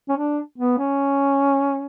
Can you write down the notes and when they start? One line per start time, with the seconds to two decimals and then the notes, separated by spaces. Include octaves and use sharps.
0.09 C#4
0.17 D4
0.58 B3
0.78 C#4